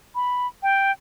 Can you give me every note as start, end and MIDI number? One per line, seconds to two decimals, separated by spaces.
0.15 0.47 83
0.63 0.92 79